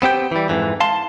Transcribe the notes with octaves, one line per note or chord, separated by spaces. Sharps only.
B3 C4 G4 G5
E3 G3
F2 G#2 E3
F5 A5 C6